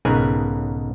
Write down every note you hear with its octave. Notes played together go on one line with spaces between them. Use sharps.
B1 G#2 C#3 A#4 B4 G#5